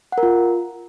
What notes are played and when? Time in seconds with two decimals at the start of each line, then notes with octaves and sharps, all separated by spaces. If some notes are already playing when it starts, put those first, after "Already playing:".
0.12 F#5
0.18 A#4
0.23 F4